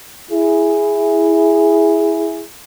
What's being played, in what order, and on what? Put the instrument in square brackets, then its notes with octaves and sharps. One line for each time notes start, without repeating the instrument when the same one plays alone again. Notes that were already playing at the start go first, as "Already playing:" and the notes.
[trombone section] E4 G#4